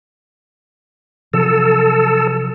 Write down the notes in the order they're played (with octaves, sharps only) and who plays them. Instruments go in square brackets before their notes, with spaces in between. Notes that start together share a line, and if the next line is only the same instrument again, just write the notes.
[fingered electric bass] C3 F3 F#3 [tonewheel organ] A4